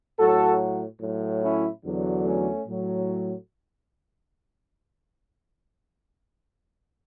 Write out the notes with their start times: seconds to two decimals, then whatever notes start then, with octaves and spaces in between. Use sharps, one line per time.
0.18 A2 F#3 F#4 A4
1.00 A2 F#3
1.42 C#4 E4
1.84 E2 D3 F#3
2.24 A3 C#4
2.67 A2 F#3